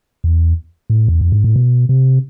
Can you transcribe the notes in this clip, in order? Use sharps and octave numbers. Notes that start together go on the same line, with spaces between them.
E2
A2
E2
F2
G#2
A2
B2
C3